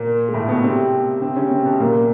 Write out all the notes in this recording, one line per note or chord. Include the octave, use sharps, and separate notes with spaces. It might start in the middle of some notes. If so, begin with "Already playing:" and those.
Already playing: A#2 A#3
G#3
A2 A3
B2 B3
C3 C4
C3 C4
C#3 C#4
C3 C4
B2 B3
A#2 A#3